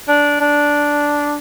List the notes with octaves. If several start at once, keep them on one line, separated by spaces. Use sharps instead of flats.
D4
D4